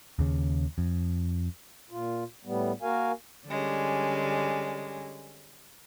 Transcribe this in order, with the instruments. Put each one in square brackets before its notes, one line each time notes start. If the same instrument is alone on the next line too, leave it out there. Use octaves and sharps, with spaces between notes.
[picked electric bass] D#2 C#3
F2
[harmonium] A#2 F4
A2 G3 B3
A#3 F#4 A#4 F5 G#5
[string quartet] D3 G3 G#3 C#4